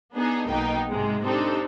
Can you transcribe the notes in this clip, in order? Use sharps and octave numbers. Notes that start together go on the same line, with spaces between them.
B3 D4 D#4 G#4
B1 B2 A#3 B3 D#4 G5
G#2 C3 G#3
C4 D4 D#4 G4 A4